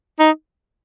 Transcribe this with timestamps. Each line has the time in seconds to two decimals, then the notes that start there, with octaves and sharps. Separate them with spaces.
0.19 D#4